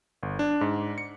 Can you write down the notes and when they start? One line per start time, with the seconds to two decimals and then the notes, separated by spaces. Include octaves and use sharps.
0.23 G1
0.39 D4
0.61 G#2
0.98 C#7